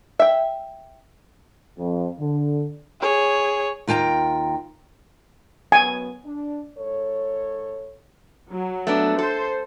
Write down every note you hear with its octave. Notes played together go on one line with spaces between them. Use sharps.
E5 G5
F2
D3
G#4 C#5
D#2 F4 G5 A5 A#5
F#2 F#3 B3 G#5
D4
G#2 A4 C#5
F#3
A3 B3 D4
A4 C5